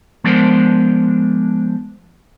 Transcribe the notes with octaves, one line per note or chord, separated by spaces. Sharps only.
F3 G#3 B3 D4 A#4 C5